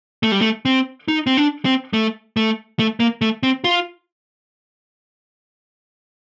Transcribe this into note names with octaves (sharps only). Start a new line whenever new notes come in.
A3
G3
A3
C4
D#4
C4
D4
C4
A3
A3
A3
A#3
A3
C4
F4